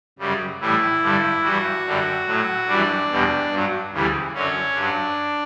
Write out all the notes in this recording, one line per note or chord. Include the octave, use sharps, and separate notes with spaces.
F#2 C#3 G3
A2 E3 G3 E4
G2 D3 G3
G2 E3 G3 F#4
F#2 D3 G3
A2 F#3
F#2 E3 G3 D4
E2 B2 G3
G2 F#3
D2 C#3 E3 G3
F#2 D3 F#3 C#4
G2 F#3 D4